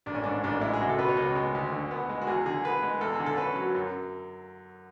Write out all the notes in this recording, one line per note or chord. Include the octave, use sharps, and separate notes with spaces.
A1 D4
C#4
G#2 D4
A1 D4
G#3 E4
G#4
C#2 F#4
A4
B2 B4
C#5
C#2 B4
G#3
D2
D3
B3
G#3
F#4
E2 G#4
D3 G#4
B3 B4
G#3
E2 A4
D3 G#4
A4
C#4 B4
F#3
F#2